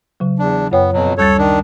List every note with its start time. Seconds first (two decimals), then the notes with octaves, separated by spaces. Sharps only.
0.20 C#3 F#3
0.39 E2 D4
0.72 F#2 B3 C#5 G5
0.93 F2 B2 F#3
1.18 D2 G3 A4 C#5 A6
1.38 D#3 D4